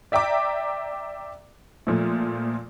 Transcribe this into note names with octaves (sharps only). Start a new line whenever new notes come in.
D5 E5 G5 A#5 D6
A#2 F3 A3